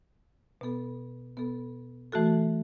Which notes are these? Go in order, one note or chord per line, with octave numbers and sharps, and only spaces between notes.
B2 B3 A4
B2 B3 A4
E3 A3 F#4 A4